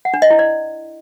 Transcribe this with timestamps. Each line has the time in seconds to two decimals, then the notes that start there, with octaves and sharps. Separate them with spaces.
0.05 F#5
0.14 D4
0.22 D#5
0.30 E4
0.39 D5